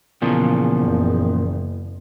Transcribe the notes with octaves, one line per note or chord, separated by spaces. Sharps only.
E2 A#2 C#3 F3
F#1